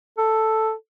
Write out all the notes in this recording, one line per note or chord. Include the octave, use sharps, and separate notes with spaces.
A4